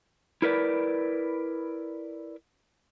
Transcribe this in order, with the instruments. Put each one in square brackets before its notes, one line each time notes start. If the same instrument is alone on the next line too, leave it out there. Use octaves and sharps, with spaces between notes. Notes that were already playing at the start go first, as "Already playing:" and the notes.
[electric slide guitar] E4 A#4 B4 D5